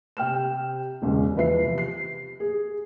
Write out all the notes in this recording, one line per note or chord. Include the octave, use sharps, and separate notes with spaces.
C3 G5 F6 E7
E1 C#2 C#3 G#3
E2 F3 B4 E5 C7
C3
C7
G#4